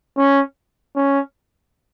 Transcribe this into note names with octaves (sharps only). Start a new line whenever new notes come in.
C#4
C#4